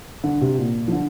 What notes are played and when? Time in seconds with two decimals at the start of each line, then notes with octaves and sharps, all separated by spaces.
0.24 D3
0.41 C3
0.58 A#2
0.88 F3
0.92 D3